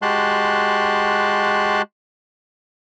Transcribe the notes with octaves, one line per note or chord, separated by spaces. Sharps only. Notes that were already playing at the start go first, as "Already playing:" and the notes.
G#3 F#4 G4 A5 C6 F#6